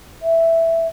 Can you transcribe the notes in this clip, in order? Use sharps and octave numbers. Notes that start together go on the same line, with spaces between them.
E5